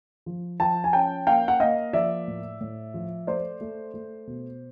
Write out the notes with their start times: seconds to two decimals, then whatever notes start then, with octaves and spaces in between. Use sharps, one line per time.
0.26 F3
0.60 F3 G5 A5
0.84 G#5
0.93 C#4 G5 A5
1.27 A#3 F5 G5
1.48 F#5
1.60 A#3 D#5 F5
1.93 F3 D5 E5
2.27 A2
2.61 A2
2.94 F3
3.27 A3 C5 D5
3.61 A3
3.94 A3
4.27 B2